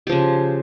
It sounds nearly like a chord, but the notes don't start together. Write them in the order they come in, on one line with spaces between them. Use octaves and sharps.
G4 F3 C#3